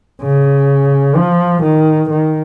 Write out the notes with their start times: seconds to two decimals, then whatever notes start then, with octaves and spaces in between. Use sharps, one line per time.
0.22 C#3
1.17 F3
1.63 D#3
2.10 D#3